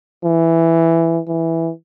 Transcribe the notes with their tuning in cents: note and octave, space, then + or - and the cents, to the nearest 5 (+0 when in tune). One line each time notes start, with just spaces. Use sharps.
E3 +5
E3 +0